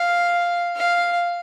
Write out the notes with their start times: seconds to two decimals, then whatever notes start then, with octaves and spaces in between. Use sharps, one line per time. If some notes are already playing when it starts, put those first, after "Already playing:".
Already playing: F5
0.76 F5